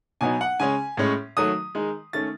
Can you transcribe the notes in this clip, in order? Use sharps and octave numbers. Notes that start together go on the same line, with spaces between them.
B2 F#3 B3 D#4 G#5
F#5
C#3 G#3 C#4 G#5
A2 G#3 C#4
D#3 F#3 A3 D#6
D#3 G#3 D#4
D#3 A3 C#4 A6